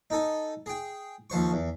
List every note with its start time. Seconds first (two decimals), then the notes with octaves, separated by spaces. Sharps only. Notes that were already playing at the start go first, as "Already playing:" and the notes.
0.10 D#4 A4 G#5
0.66 G#4 G5
1.30 D#2 F3 C5 C#6
1.53 E2